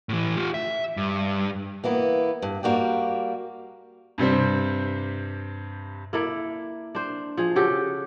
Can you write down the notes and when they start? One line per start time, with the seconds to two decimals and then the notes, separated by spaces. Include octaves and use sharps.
0.09 A2 E3
0.37 F4 G4
0.54 E5
0.97 G2
1.84 E3 A#3 B3 E4
2.42 G2
2.63 G3 A#3 F#4 G4
4.18 G2 C3 G3 C4
6.13 A#3 E4 A4 D5
6.95 D4 C5
7.37 F3 G#4
7.56 C#3 F#4 G4 A4